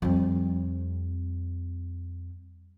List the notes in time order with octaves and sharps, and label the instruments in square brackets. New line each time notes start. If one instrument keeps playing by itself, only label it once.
[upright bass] F2 G3